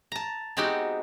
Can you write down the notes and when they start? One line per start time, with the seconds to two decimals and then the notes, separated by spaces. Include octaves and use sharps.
0.12 A5 A#5
0.57 G#3 B3 C4 D#4 F#4 G4